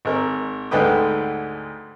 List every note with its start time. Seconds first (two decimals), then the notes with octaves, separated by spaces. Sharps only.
0.05 G#1 A#4
0.71 D2 G#2 D3 B4 G5 D#6